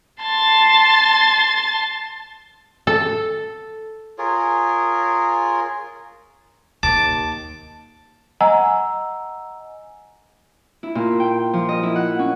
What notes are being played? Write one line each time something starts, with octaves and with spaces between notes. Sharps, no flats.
A5 C6 A6
A4
F4 G#4 A#4 C#5
D#2 A5 D6
D#5 F#5 G#5 A#5 E6
E4
A#2
G5
F3
D#5
E4
F#5
C#4